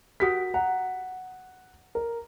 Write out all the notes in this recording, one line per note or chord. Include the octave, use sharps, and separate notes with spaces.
F#4 G4 A#4 D#6 B6
F#5 A#5
A#4